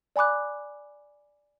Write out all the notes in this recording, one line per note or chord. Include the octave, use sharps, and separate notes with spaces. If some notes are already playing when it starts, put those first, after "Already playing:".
D5 G#5 B5 D6 F#6